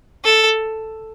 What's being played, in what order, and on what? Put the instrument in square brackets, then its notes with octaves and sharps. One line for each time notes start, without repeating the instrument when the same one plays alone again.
[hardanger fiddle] A4